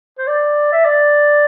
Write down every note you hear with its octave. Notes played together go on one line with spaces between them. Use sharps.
C5
D5
E5
D5